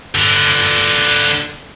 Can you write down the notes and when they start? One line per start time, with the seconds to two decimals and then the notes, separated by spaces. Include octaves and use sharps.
0.15 D3 B3